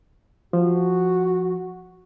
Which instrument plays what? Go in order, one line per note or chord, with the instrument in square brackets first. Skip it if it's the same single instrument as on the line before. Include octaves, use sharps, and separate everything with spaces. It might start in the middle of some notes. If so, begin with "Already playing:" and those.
[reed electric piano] F3 [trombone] F#4